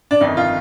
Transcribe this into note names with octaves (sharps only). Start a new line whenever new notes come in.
D4
G1 F2 D#3 D#4
F4